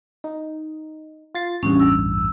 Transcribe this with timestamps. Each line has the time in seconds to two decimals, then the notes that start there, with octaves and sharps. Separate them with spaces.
0.24 D#4
1.35 F4 A6 C7
1.63 A1 E2 G2 C#4
1.80 E6